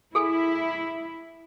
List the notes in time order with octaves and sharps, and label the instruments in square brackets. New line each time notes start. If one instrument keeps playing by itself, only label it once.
[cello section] E4 [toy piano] G#4 A4 G#5